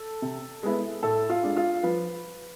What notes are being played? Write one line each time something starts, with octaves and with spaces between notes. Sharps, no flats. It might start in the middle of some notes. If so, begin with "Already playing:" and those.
Already playing: A4
C3
G#3 B3 E4
A2 A4
F4
G#3 D4
F4
F3 B4